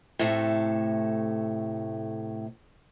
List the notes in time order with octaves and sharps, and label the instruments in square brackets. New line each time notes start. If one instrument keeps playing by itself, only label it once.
[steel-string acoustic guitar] A2 C3 A3